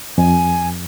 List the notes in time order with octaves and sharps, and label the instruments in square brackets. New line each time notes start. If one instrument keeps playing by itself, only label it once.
[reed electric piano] F2 [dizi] G#5